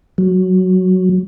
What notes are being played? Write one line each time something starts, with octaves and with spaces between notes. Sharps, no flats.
F#3